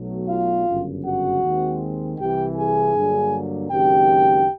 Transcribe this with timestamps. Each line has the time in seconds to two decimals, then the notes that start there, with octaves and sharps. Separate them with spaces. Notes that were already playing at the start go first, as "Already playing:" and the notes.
Already playing: B1 B2 F#3 A3
0.29 F4 F5
0.67 G1 F#2 C#3
1.05 F#4 F#5
1.43 D#2 D#3 G#3 C4
2.19 C2 C3 E3 G4 G5
2.57 G#4 G#5
2.95 G2 D3 F#3 A#3
3.71 F#1 F#2 D#3 G#3 C4 G4 G5